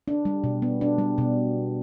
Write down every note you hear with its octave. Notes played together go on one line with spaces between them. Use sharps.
D4
G3
B2
B3
D4
G3
B2